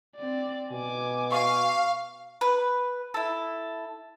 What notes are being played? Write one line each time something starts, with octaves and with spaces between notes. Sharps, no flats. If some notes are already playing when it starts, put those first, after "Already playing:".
C4 D5
B2 G#5 D6
F5 C#6
B4
E4 A4